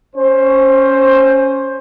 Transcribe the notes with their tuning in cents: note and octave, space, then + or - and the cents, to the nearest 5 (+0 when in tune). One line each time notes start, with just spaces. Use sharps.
C#4 +0 C5 +15